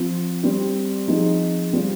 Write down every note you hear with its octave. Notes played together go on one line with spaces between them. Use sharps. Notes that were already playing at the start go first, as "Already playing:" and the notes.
Already playing: F3 C4 F4
G3 C4 G4
F3 C4 D#4 G#4
C3 G3 C4 F4